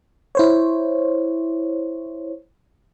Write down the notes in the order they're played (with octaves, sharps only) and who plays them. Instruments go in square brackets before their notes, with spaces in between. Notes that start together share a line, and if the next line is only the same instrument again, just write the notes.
[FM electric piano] E4 C5 C#5